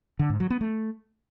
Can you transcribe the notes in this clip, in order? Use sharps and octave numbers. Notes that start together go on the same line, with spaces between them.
D3
G#2
F#3
B3
A3